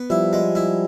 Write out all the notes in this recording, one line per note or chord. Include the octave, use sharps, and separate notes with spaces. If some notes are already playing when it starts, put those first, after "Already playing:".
Already playing: B3
F3 G3 E4
G#3
E4